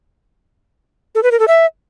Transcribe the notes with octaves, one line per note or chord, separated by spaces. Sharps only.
A4
B4
A#4
A4
E5